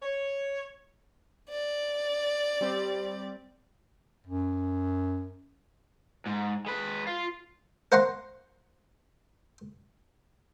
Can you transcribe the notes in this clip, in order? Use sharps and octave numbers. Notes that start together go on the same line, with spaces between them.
C#5
D5
G3 C4 G4
F#2
G#2
G#3 B4
F4
A#4 C5 F5 F#5 A#5 C6